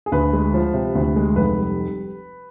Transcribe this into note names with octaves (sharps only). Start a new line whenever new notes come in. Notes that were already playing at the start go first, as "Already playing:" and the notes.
G#4
D2 B4
G#3
F3
C3
D2
G#3
F1 B4
G3